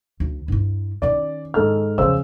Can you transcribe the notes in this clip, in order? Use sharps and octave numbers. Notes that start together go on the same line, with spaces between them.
D2
G2 E4
D#3 C#4 D5
G#2 A4 F6
E2 C#3 F3 C5 E6